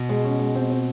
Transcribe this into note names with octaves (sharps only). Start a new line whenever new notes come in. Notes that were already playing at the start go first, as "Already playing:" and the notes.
Already playing: B2
G#3
C#4
G#3
C4
C4